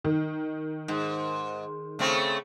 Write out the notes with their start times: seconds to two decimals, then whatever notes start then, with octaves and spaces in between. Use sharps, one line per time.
0.05 D#3
0.88 G#2
1.99 C#3 A3 C4